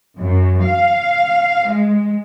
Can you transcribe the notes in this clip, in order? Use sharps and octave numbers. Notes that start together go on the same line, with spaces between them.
F#2
F5
G#3